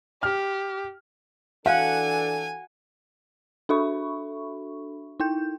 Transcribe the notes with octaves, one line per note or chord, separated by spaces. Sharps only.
G4 F6
E3 D4 A4 F5 F#5 G#5
D4 F#4 A4 E5 B5 C#6
D#4 E4 G5 G6